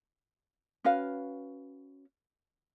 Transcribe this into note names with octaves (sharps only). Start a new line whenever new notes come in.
C#4 F#4 B4 F5